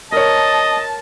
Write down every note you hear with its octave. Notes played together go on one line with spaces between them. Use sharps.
A#4 C#5 D#5 A5